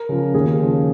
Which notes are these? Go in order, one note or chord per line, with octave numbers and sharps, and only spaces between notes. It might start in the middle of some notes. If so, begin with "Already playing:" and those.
Already playing: A#4
C#3 F3
D#2 G#4
C#3 F3